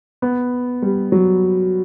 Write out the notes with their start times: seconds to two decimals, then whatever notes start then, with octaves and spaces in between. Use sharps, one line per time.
0.22 B3
0.82 G3
1.12 F#3